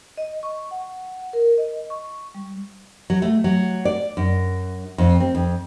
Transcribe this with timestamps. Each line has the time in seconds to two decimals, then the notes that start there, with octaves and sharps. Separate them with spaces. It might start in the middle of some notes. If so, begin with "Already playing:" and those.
0.17 D#5
0.43 C#6
0.71 F#5
1.33 A#4
1.58 D#5
1.90 C#6
2.34 G3
3.10 F#3
3.22 A3
3.44 F#3
3.85 D5
4.17 F#2
4.98 F2
5.20 C4
5.35 F2